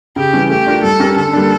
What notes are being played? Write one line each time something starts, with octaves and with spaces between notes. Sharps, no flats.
C#3 G4
E3 G3 C#4
A3 G4
D4 F4 A#4
G3 A4
C#4 G4 A#4
D3 A4
G3 A#3 D4